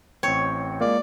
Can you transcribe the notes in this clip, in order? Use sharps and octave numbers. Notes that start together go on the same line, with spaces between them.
A1 C4 C#5 G5
G#3 A#3 F4 G#4 D5